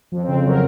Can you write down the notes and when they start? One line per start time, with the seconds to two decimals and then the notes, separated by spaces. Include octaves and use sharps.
0.12 F2
0.24 C#3 C4
0.44 F#3 A#4